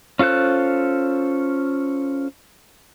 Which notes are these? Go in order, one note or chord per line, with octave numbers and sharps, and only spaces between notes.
C#4 F4 A4 C5 F#6